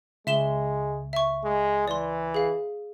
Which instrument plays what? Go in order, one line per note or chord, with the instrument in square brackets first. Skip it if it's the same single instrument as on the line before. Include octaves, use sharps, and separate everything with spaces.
[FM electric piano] C#2 [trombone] G#3 [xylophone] E5 E7 G7
[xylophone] E5 C#6
[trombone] G#3
[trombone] E3 [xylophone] D5 C6
[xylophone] G#4 F5